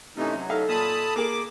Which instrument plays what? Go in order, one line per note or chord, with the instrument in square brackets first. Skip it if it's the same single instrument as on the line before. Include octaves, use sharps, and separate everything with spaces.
[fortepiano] C3 C#4 [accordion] E3 A3 D#4
[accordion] F#3
[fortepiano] D#4 E5 F5 [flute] A4
[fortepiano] A#2 [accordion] A5 B5 D#6
[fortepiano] A#3 G#4 [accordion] D6